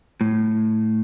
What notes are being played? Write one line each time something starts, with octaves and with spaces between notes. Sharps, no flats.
A2